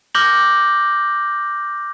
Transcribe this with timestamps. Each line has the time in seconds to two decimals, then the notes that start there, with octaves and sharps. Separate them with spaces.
0.15 D6 F6 G6 A#6 F#7 G7